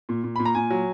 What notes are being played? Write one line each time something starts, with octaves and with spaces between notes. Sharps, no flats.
A#2
A#2
A#2 B5
A#5
A#2 G#5
F#3